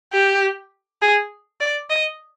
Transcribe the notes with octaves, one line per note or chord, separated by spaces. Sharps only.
G4
G#4
D5
D#5